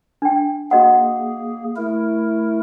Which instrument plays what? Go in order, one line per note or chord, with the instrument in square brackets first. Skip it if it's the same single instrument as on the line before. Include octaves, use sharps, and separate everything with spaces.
[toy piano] D4 G5
[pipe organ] A#3 G#4 [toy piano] F#4 D#5 F#5
[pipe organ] A3 E4 A#4